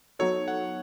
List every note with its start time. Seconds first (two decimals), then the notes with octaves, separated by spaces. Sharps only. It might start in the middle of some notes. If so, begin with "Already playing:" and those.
0.19 F#3 B3 D#4 F#4 A4 C#5
0.48 F#5